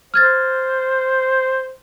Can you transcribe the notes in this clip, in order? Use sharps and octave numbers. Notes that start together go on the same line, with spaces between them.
C5 F6 G#6 A6